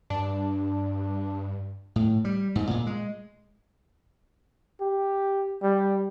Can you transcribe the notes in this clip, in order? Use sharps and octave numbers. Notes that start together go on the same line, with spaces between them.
G2 D4
A2
G3
G#2
A#2
G#3
G4
G3